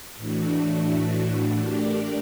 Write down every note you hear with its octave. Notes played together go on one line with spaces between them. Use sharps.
A2 E3 A3 D4 F#4
A3 D4 G4 A#4 D5